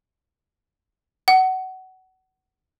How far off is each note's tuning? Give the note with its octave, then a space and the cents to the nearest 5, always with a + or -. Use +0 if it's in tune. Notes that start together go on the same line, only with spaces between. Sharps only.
F#5 +20